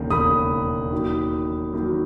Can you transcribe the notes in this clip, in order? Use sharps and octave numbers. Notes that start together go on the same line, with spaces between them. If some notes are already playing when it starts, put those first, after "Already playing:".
Already playing: E1 D#2 C#3
E1 D#2 C#3 B5 D#6
D#2 D#3 F#3
D#2 D#3 F#3